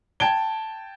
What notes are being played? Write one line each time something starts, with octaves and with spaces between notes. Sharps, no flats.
G5 A5 G#6 D7 G7